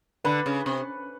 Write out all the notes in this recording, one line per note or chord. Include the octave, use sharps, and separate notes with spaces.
D3 B4 B5
C#3
C3